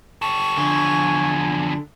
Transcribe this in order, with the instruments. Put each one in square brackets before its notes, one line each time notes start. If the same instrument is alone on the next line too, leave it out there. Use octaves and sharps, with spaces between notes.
[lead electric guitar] G4 A4 [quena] C#6
[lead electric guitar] E2 F3 [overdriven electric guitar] D3 [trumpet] G#5